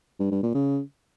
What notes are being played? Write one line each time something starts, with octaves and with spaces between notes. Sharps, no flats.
G2
G2
A#2
C#3